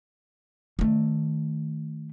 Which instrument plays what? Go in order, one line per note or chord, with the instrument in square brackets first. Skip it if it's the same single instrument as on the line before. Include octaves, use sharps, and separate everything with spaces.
[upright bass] D#3 A3